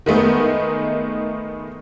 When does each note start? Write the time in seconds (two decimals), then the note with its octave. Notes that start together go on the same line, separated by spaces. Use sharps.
0.06 D#3 G#3 A3 B3 D#4